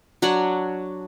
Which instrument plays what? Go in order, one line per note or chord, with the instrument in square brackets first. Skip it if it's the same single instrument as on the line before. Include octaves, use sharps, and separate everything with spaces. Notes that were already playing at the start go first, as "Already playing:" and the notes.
[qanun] F#3 D4 C#5 F#5